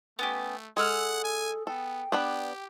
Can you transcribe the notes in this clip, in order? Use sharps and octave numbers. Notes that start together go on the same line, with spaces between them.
A3 B3 C#4 G4
G#3 G#4 A4 F#5 E6 F6
G#5
B3 A4 G5
B3 D4 G4 B4